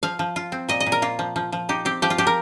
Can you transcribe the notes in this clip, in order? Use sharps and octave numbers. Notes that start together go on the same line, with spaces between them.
F3 F5
F3
F4
C4
A#2 D#5
D#5
A#2
A#4
A#3 F4
F3
F3
F3
D#4 G4
C4 G4
F3 G4
F4
F3 G4
A#4